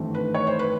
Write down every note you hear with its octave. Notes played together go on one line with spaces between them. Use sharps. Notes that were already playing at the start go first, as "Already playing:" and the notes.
Already playing: G#1 G2 E3 A3 C4
B4
C#5
C5
B4